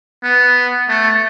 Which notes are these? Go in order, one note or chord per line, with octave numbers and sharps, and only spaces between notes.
B3
A3